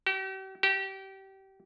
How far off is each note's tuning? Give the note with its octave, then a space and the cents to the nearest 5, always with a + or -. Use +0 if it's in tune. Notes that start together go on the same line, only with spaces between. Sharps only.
G4 -40
G4 -25